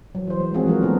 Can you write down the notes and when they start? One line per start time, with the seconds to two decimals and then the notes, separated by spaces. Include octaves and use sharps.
0.15 F#3
0.27 E3 C5
0.40 G#3
0.54 E3 F3 A#3 C4 F#4 G#4
0.67 F#3 A#3 F#4 A#4
0.82 A3 B3 D4 G#4